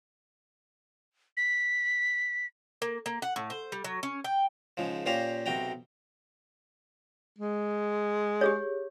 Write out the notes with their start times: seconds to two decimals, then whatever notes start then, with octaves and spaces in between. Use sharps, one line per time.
1.37 B6
2.82 A#3
3.06 A#3
3.22 F#5
3.36 A2
3.50 C5
3.72 G3
3.84 F#3
4.03 C#4
4.24 G5
4.77 G#2 C#3 F3
5.06 A#2 C#4 G4 C5 F5 A#5
5.46 B1 C3 F#4 G5 A#5
7.38 G#3
8.41 G4 G#4 C#5